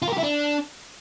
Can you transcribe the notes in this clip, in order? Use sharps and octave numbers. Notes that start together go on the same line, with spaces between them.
F4
A#4
G4
E4
D4